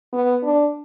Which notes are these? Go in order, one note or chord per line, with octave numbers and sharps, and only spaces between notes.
B3
D4